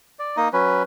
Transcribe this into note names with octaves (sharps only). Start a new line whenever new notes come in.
D5
A#3 D#4 D#5
F#3 C#4 B4